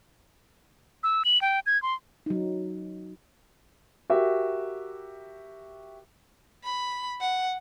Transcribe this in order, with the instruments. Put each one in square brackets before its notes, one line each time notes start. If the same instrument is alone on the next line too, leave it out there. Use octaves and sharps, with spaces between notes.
[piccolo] E6
F#7
G5
G#6
C6
[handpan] F#3 D#4
[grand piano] F#4 G4 A#4 E5
[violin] B5
F#5